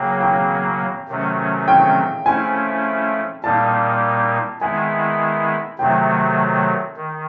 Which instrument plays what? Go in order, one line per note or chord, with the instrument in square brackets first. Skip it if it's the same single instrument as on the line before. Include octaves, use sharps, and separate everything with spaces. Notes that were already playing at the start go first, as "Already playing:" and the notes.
Already playing: [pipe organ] C#3 F#3 A#3 [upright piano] G5
[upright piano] G5
[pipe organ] C3 D#3 F#3 A3 C#4
[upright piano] G5
[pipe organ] F3 A3 C#4 E4 [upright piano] G#5
[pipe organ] A#2 G3 A#3 D#4 [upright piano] A5
[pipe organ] D#3 G#3 B3 E4 [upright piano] G#5
[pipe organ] C3 D#3 F#3 A3 [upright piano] G5
[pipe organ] D#3